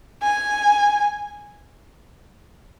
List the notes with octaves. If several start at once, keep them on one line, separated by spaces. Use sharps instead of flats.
G#5